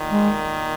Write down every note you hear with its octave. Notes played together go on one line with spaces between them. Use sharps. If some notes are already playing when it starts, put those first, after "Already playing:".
Already playing: A#2 D#3
G#3